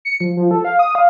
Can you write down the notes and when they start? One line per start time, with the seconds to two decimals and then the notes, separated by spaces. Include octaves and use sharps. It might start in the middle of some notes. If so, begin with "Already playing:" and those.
0.05 C#7
0.20 F3
0.37 F3
0.51 A4
0.65 F5
0.79 D#6
0.95 F5